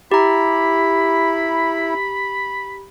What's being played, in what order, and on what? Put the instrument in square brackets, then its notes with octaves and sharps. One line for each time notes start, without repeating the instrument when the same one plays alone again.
[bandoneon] E4 [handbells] G4 A#5 [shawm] B5